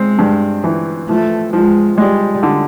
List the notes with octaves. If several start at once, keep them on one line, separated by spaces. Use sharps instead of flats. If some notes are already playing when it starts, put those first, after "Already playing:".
Already playing: G#3 C4
G2
E3
F3 A3
F3 G#3
G3 G#3
D3